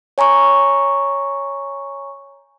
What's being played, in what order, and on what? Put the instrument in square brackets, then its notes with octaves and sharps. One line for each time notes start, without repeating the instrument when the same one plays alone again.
[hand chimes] C#5 G#5 A#5 C#6